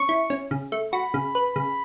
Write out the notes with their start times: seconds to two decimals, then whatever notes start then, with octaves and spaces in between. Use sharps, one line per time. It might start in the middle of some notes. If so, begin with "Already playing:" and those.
Already playing: C#4 C#6
0.09 E4
0.30 C#4
0.51 C#3
0.72 A3
0.93 F#4 B5
1.14 C#3
1.35 B4
1.56 C#3